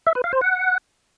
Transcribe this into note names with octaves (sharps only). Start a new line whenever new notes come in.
E5
B4
F5
C5
F#5